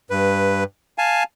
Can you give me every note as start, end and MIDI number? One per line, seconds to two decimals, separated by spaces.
0.10 0.64 43
0.10 0.64 71
0.98 1.23 77
0.98 1.23 80
0.98 1.23 81